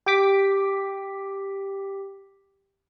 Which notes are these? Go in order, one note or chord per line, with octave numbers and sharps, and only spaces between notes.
G4 G5 D6 B6